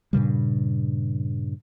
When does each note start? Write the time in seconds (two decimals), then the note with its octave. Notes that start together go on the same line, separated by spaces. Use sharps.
0.13 G2 A#2 C#3 G3